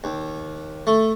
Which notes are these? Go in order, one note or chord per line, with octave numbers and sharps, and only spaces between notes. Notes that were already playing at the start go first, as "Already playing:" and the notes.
D#2
A3